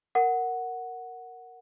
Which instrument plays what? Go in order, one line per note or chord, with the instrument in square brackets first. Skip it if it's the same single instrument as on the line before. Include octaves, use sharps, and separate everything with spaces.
[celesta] A#4 F#5